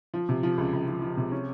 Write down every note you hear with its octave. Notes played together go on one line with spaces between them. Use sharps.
F3
C3
F3
C#2
C#2
F3
F3
C3
C#4